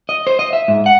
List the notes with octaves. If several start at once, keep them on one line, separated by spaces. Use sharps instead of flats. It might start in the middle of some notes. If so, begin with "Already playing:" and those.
D#5
C5
D#5
E5
G#2
F#5